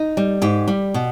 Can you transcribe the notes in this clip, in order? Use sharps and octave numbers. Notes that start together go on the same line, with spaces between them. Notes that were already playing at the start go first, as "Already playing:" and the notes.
Already playing: D#4
G3
G#2 G4
G3
B2